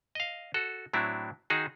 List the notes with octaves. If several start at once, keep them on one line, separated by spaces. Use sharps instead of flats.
D#5 F5
F#4 A4
A2 F#3 C4 D4 E4
D#3 D#4 F#4 G#4